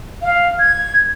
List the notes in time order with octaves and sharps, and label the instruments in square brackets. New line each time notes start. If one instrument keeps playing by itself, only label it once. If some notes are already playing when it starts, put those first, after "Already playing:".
[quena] F5
G#6